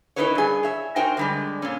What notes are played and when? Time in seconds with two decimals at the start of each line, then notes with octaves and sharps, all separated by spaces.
0.16 C#4 D#4 E4 A#4 B4 C#5
0.35 G2 G#4
0.63 C#5 E5
0.96 D#4 F#4 A#4 C5 G5 G#5
1.17 D3 G3 G#3
1.62 A#2 C#4